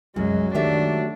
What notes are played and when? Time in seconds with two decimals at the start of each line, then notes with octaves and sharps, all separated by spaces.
0.16 C2 F#2 F#3 G#3 F#4
0.55 D#3 A3 D4 G4 E5